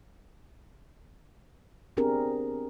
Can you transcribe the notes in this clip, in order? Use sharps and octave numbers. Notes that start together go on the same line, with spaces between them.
B3 C4 D4 G4 G#4 A#4